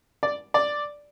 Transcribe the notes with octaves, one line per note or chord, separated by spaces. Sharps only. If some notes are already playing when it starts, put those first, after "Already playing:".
D5
D5